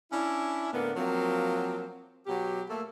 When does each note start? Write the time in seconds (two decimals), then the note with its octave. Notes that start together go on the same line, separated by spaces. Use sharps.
0.12 C#4 D4 E4
0.72 A2 D3 A#3 B3
0.96 F3 F#3 A#3 C4
2.27 B2 F#3 G4
2.69 A3 A#3